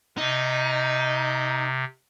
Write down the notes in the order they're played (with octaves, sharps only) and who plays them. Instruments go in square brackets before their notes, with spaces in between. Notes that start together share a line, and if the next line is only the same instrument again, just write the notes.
[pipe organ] C3 [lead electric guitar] D#4